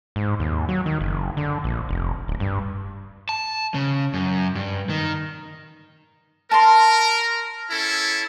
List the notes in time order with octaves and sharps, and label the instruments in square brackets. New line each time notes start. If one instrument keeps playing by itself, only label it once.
[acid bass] G#2
D#2
F#3
D#3
F#1
D3
A#1
F1
D1
G2
[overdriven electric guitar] A5
C#3
F#2
G2
D#3
[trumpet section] A#4 [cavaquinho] A5 C6
[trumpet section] C#4 E4 A4